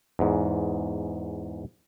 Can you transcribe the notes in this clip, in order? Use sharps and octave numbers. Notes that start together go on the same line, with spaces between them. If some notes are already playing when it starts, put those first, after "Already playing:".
E2 G#2